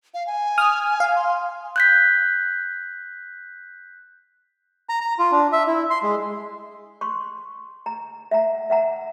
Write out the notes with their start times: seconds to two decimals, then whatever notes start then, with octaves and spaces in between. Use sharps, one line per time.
0.14 F5
0.27 G#5
0.58 D#6 F6
1.00 F5
1.16 C6
1.76 F#6 G6 B6
4.89 A#5
5.01 A#5
5.19 F4
5.32 D4
5.53 E5
5.67 E4
5.90 C6
6.03 G#3
7.01 C6 C#6
7.86 A#5
8.31 E5 F#5 A#5
8.70 E5 F#5 A#5